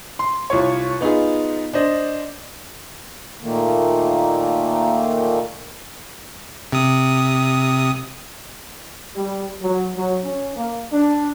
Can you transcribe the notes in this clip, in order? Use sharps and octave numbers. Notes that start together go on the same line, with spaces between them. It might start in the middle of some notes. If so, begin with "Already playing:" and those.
C6
C2 F4 C#5
B3 D#4 F4 G#4
D4 C5 D#5
A#2 D#3 A3 A#3
C3 D#6
G3
F#3
F#3
C#4
A#3
D4